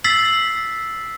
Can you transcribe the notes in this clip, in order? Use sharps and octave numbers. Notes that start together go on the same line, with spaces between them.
E6 A6 B6 C7 F#7